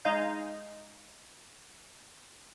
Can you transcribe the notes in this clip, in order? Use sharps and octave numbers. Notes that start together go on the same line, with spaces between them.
G#3 D#4 D#5 F5 G6